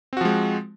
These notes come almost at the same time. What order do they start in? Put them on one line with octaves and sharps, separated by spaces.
C4 F#4 F3 G#3